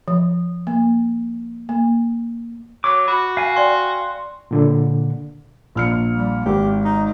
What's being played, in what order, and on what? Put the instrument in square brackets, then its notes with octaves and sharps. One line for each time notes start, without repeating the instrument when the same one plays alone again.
[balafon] F3
A#3
A#3
[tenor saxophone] F#3 [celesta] C#6 [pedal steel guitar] D6
[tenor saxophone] F#4 [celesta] B5
[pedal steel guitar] F5 G#5
[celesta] D5 G5 [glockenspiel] C6
[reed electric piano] A#2 D3
[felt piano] A#1 F6 C#7
[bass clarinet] G3
[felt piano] G#1 [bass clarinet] G4
[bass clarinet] D#4